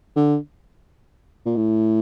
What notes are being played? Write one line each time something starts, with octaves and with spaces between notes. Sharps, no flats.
D3
A#2
A2